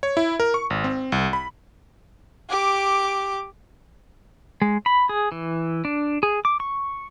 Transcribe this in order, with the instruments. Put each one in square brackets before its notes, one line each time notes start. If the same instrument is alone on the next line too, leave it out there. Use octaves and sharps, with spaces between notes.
[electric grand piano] C#5
E4
A#4
C#6
G#1
C4
C2
B5
[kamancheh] G4 D6
[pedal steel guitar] G#3
B5
G#4
E3
D4
G#4
D6
C#6